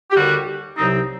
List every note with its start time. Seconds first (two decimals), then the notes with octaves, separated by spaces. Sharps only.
0.11 G4
0.15 D#2 D3 G3 F#4
0.78 C2 C3 F#3 C4 D#4